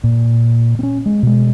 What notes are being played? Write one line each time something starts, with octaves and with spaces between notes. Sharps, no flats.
A#2
C4 C#4
G#3
B2 G#3